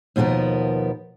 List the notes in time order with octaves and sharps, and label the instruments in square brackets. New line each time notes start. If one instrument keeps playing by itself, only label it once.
[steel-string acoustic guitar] D#2 B2 F3 B3 A#4